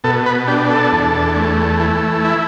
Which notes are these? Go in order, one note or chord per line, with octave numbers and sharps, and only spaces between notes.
B2 A4
B4
D4 G4
A4
E2
A3
E3
E4